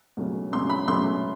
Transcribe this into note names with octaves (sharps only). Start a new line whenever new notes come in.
C#2 B2 F#3 A3 C#4
C#2 B2 F#3 A3 C#4 C6
B5
C#2 B2 F#3 A3 C#4 C6